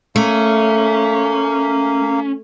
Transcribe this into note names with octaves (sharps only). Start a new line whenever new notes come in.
A3 A#3 C#4 F5